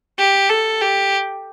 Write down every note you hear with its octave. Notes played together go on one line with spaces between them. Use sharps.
G4
A4
G4